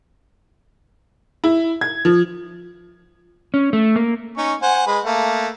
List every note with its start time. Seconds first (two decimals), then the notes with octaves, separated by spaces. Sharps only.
1.44 E4
1.81 G#6
2.05 F3
3.54 C#4
3.73 A3
3.96 A#3
4.38 C#4 D#4 C#6
4.62 C5 F#5 G#5
4.86 G#3 B4
5.05 A3 A#3